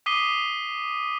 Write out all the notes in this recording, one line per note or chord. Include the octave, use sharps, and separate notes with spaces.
D6 D#6 B6 C7 D#7 G7